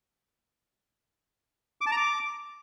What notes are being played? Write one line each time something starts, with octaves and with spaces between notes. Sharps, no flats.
D6
A5
A#5
D6